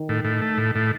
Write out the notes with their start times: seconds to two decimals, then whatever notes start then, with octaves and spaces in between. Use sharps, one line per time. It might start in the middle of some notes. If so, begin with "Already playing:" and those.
Already playing: D#3
0.09 A2
0.25 A2
0.41 A3
0.58 A2
0.75 A2